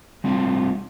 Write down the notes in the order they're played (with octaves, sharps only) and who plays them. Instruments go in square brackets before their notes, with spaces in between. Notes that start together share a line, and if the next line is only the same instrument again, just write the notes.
[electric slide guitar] G3 C4 D4 F4